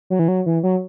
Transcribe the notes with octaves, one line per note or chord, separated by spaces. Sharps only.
F#3
E3
F#3
E3
F#3